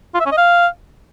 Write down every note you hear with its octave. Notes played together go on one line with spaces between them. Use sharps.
F4
E5
C#4
D#5
F5